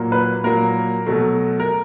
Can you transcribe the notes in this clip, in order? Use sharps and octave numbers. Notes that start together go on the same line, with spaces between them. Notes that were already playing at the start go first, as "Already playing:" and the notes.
Already playing: A#2 F#3 A#3
B4
A#2 F#3 A#3 A#4
B2 F#3 A3
A#4